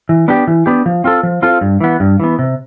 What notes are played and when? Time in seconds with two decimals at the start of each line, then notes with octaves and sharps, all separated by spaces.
0.09 E3
0.28 B3 D4 G4
0.47 E3
0.66 B3 D4 G4
0.86 F3
1.04 C4 F4 A4
1.23 F3
1.42 C4 F4 A4
1.61 G2
1.81 E3 B3
2.00 G2
2.20 E3 B3
2.39 C3